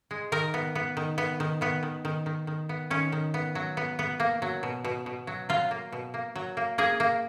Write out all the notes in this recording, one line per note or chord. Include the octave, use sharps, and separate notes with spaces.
G#3
D#3 A#4
B3
B3
D#3
B3
D#3
D#3 B3
D#3
D#3
D#3
D#3
B3
D#3 C#4
D#3
B3
F#3
B3
B3
A#3
F#3
B2
B2
B2
F#3
F#3 F4
A#3
B2
A#3
F#3
A#3
A#3 G#4
A#3